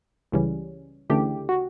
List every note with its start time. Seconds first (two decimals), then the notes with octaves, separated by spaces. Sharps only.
0.32 C#2 C#3 E3 G3 C#4
1.10 D2 C#3 E3 A3 D4 G4
1.49 F#4